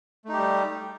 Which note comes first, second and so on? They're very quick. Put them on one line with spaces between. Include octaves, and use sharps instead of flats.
A3 D#4 G4 G3